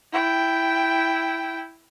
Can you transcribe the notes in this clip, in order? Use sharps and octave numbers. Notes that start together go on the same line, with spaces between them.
E4 G5